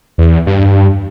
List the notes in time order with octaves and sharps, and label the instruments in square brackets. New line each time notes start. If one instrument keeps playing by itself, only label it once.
[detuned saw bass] E2
G2